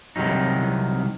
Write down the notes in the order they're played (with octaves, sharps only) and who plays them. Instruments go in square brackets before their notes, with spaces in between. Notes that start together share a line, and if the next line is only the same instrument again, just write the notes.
[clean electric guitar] C2 C3 D#3 F#3 D#4